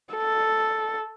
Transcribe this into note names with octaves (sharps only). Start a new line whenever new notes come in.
A4